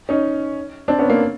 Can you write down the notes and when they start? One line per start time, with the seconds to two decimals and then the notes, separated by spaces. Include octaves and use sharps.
0.09 C#4 D#4
0.88 C4 D4
0.99 B3 C#4
1.09 A#3 C4